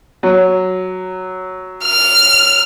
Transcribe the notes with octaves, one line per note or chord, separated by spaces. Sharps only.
F#3
F6